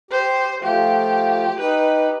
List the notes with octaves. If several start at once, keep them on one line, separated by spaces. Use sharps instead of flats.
G4 C5
F3 A3 F4 G4
D#4 G4 B4